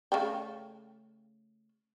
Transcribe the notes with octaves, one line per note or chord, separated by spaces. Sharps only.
C#3 A3 G5